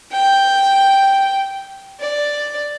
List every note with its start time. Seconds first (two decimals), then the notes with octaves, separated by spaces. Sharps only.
0.12 G5
2.00 D5